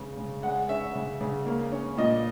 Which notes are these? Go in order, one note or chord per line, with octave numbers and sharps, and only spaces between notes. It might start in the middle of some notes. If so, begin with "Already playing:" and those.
Already playing: C#3 G#3 B3
C#3
G#3 F#5
C#4 E5
C#3
C#3
A#3
C#4
A#2 D#5